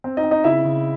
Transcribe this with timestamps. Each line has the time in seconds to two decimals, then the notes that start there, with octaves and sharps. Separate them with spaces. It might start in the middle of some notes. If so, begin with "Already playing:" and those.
0.04 C4
0.17 D#4 D#5
0.24 C4
0.31 D#4 D#5
0.44 C#3 E4 E5
0.64 C#3